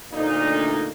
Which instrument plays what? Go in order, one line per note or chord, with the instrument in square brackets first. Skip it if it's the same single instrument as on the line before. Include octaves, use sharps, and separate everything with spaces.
[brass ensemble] D2 A#2 D#4